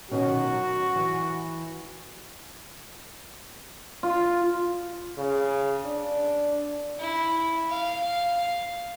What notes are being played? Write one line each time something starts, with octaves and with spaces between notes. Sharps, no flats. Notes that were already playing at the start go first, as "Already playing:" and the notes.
B2 D#3 C#4 F#4
F#3
E3
F4
C#3
D4
E4
F5